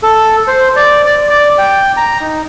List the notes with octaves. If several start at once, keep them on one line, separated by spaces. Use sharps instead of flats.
A4
C5
D5
D5
D5
G5
A#5
D#4